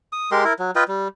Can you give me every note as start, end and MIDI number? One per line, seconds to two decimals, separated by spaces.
0.13 0.30 87
0.32 0.44 56
0.32 0.44 67
0.32 0.44 70
0.32 0.44 84
0.44 0.53 64
0.44 0.53 70
0.59 0.71 54
0.76 0.84 65
0.76 0.84 71
0.76 0.84 75
0.76 0.84 79
0.88 1.08 55